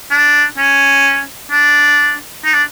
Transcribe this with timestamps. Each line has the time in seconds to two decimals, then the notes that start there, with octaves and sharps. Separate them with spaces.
0.11 D4
0.58 C#4
1.51 D4
2.44 D#4
2.53 D4